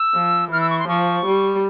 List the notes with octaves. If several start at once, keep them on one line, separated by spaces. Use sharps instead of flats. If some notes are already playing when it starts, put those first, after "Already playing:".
Already playing: E6
F3
E3 F6
E6
C#6
C6
F3 C#6
G3